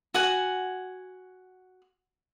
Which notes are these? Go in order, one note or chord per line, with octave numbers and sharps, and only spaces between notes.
F#4 F#5 G#5